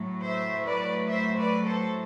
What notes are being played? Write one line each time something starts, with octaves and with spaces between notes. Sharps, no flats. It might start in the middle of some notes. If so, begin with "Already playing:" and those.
Already playing: A2 F#3 A3
C5 E5
B4 D5
C5 E5
B4 D5
A4 C5